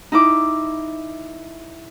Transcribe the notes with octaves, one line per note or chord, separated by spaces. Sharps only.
D#4 E4 D6